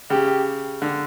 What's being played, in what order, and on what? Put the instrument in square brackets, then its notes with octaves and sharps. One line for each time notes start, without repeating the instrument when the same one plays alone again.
[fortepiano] C#3 [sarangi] G4
[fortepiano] D3